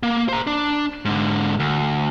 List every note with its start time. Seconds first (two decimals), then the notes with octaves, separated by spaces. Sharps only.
0.03 A#3
0.29 C5 A#5
0.47 D4
1.05 G#2 D3
1.59 D2